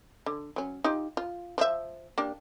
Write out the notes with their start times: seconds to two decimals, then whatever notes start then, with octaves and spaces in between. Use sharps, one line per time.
0.26 D3
0.56 F#3 C#4
0.84 D#4 F4 G4
1.17 F4
1.58 F3 E5
2.18 A#3 D4 G4